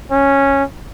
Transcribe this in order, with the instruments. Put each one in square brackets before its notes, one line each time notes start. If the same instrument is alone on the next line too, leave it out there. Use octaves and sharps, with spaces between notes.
[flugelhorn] C#4